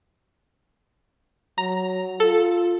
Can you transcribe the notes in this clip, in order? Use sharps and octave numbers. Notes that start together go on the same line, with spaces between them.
F#3 A#5
F4 A4